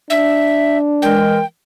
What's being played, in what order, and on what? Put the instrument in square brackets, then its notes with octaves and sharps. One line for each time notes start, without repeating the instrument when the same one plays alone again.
[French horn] D4 [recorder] E5
[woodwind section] E3 G#3 A#4 [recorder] G5